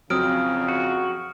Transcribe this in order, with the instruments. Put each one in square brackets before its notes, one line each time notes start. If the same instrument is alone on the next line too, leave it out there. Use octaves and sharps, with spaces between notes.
[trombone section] F2 C#3 [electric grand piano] F#3 C4 [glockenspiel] D#6 F6 D7
[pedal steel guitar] F#4